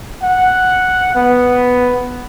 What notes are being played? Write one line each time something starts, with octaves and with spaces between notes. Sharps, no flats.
F#5
B3